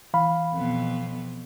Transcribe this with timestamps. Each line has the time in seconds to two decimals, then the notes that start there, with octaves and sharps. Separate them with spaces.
0.14 E3 F5 B5
0.53 F2 B2 B3